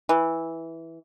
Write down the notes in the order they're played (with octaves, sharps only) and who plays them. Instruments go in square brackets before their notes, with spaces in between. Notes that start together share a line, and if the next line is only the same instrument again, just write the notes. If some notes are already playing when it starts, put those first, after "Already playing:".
[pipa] E3